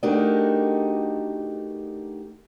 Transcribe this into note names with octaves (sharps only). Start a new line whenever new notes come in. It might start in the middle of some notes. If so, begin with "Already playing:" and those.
A3 D4 D#4 F#4 G4 A#4